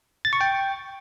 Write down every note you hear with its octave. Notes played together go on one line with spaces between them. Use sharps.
A6
C#6
G5